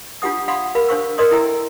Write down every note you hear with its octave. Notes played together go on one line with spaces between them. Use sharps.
D4 F4 G4 F#5 D#6
D5 F5 F#5 B5 C6 D#6
G4 A#4 F5 B5
D4 C5 F5 C#6 E6
A#4 D5 D#5 C6 D#6
E4 A4 E5 G5 A#5 E6